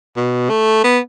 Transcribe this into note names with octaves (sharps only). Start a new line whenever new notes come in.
B2
A3
B3